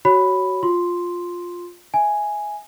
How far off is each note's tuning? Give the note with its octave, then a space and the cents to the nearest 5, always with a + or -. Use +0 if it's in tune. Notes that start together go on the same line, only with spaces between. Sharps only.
F#4 +20 C#5 +0 B5 +0
F4 +10 C6 +0
E5 +0 G#5 +0